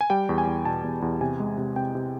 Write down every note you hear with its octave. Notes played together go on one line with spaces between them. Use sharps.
G#5
G3 G5
E2
G#5
E2
B2 A5
E2
E2
C3 G#5
G#3
C3
C3 G5
C3